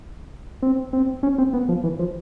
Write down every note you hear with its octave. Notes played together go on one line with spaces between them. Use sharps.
C4
C4
C#4
C4
B3
F3
E3
F3